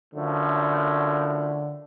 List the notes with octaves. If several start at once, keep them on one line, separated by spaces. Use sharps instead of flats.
F#2 A2 D3 F3